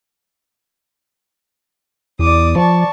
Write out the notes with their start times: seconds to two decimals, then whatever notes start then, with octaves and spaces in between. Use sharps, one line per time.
2.19 E2 D5 D6 D#6
2.56 F3 D5 A5 C#6